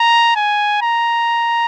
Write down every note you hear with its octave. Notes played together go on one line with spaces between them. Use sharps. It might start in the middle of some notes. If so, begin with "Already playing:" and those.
Already playing: A#5
G#5
A#5